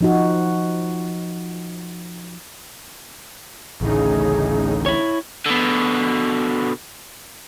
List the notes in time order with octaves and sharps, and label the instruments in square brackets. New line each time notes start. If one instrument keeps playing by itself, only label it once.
[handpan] F3 D#4 F#4
[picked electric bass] A1 D2 [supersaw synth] A2 C#3 D#4 [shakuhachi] G#4
[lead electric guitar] E4 C#5
[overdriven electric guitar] B2 D3